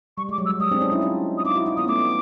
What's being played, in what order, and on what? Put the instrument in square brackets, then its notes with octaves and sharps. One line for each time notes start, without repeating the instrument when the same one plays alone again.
[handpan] G3 [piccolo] C#6
[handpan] G#3
[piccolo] D6
[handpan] F#3
[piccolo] E6
[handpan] G3
[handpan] G#3 [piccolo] D#6
[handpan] C4 D4
C#4 D#4
D4 E4
D#4 F4
[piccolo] D#6
[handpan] D#4 F4 [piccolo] D6
[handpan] E4 F#4
D#4 F4
[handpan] B3 C#4 [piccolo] D#6
[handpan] A3 B3 [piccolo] D6